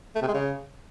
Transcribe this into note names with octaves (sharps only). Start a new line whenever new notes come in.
A3
C3
G#3
C#3